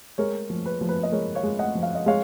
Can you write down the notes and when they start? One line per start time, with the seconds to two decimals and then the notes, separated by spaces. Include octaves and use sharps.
0.18 G#3 A#4 C#5
0.50 F3
0.66 B4
0.81 F3
0.89 B4
1.03 D#5
1.12 G#3 A#4 C#5
1.35 C#5 F5
1.43 G#3
1.59 D#5 F#5
1.75 F3
1.83 F5
1.95 D#5
2.06 G#3 C#5 F5